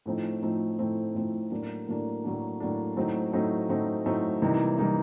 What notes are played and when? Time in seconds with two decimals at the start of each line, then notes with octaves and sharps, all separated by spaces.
0.06 A2 F3 A3 C4 D#4
0.42 A2 F3 A3 C4 D#4
0.79 A2 F3 A3 C4 D#4
1.15 A2 F3 A3 C4 D#4
1.51 A2 F#3 A#3 D4
1.87 A2 F#3 A#3 D4
2.24 A2 F#3 A#3 D4
2.60 A2 F#3 A#3 D4
2.96 A2 F#3 A3 C4 D#4
3.33 A2 F#3 A3 C4 D#4
3.69 A2 F#3 A3 C4 D#4
4.06 A2 F#3 A3 C4 D#4
4.42 C3 E3 G3 A#3 D#4
4.78 C3 E3 G3 A#3 D#4